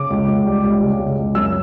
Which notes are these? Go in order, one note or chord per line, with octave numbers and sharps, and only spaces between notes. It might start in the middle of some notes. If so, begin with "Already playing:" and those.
Already playing: C#3 D6
C#2
C#2
G3
C#2
C#3
C#2
C#2
F#2 E6